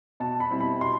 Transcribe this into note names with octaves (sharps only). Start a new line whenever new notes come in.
B2 A5
B5
G3 C4 E4
B5
B2 C6